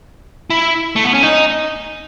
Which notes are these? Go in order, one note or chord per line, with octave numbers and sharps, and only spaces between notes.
E4
A3
B3
C#4
D#4